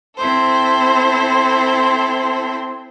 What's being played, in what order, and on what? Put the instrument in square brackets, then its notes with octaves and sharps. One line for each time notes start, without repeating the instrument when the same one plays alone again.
[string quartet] C4 E4 A4 C5